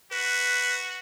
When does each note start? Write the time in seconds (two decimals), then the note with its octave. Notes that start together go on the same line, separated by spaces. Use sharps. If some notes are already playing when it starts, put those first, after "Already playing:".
0.12 F#4 B4